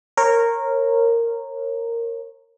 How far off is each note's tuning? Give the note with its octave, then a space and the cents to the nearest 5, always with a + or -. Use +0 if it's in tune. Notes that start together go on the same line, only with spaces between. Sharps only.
A#4 -10 C#5 -30